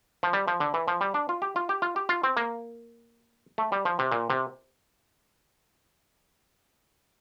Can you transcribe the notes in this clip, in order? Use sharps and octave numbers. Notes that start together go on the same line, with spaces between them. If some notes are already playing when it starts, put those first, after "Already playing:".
F3
G3
F3
D3
E3
F3
G3
D4
F4
G4
F4
G4
F4
G4
F4
C4
A#3
A3
G3
F3
C3
A#2
C3